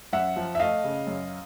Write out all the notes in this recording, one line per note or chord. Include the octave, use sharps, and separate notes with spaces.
F#2 E5 F#5
F3
E5
A3 D#5 F5
C#3
F#2